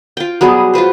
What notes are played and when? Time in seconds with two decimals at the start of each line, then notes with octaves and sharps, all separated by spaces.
0.17 F4 G5
0.41 F#3 G3 B3 G#4
0.74 F4 F#4 B4 C5